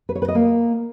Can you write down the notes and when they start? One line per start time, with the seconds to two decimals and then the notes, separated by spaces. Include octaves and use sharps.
0.09 B4
0.15 C#5
0.22 B4
0.28 D#5
0.35 A#3